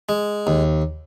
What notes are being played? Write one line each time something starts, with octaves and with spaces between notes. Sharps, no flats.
G#3
D#2